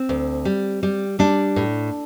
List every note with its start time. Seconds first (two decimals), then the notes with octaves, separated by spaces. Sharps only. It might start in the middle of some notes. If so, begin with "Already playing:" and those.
Already playing: C4
0.09 D2
0.45 G3
0.83 G3
1.19 G3 D4
1.56 A2